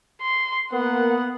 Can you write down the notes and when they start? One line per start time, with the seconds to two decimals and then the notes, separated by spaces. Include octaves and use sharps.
0.21 C6
0.72 A#3 B3 A#4 F#5